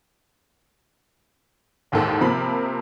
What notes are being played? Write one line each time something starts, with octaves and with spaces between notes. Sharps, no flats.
A1 D#2 G#2 A4 F#5
C3 F3 A#3 B5